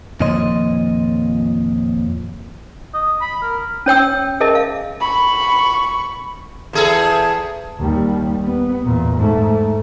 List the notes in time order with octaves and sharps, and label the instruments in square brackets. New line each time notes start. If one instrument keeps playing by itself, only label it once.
[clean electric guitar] F2 A#2 D#3 C#5 D#5 C6
[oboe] D#5
B5
A#4
[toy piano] C#4 C#5 G5 E6
G#4 A#4 D#5 E5 A5
F5
[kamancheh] B5 C#6
[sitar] E2 G#4 A4
[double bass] D#2 G3
B3
E2 A#2
G#2 A3